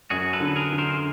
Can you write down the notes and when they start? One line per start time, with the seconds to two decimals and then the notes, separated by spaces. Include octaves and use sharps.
0.10 F#2 F#4 G#4
0.33 A4 B4
0.40 D3
0.56 G#4 A#4
0.72 D3
0.78 A#4 C5